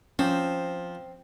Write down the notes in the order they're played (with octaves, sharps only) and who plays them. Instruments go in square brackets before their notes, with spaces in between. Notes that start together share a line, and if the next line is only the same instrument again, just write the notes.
[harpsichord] F3 [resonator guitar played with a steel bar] C4 [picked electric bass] C#4